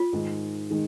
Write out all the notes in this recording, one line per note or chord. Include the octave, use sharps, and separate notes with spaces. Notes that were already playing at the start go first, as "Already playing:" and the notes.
Already playing: F4
G#2 D#3 G#3
D#3 G#3